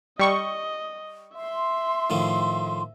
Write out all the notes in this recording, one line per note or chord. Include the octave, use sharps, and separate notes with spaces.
G3 D#5 C#6
E5 C6
A2 D#3 F3